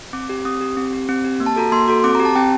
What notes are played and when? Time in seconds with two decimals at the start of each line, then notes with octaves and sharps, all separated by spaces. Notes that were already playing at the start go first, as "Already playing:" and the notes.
0.13 C4 D6
0.29 G4
0.45 C4 D#6
0.61 G4
0.77 C4
0.93 G4
1.09 C4
1.24 G4
1.40 A#3
1.46 A5
1.56 F#4 A4 A#5
1.72 A#3 C6
1.88 F#4 A4
2.04 C4 D6
2.15 G4 A#5
2.25 A5
2.36 C4 G5